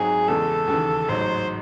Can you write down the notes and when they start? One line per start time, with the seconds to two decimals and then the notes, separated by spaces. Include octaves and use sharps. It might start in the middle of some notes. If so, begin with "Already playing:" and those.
Already playing: G#2 F#3 C4 G#4
0.28 E2 C#3 E3 G#3 A4
0.68 D#2 C#3 E3
1.08 A1 G#2 F#3 C5